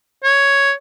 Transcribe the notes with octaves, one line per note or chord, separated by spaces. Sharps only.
C#5